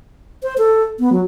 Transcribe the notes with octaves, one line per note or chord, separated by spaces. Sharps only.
C5
A4
B3
F#3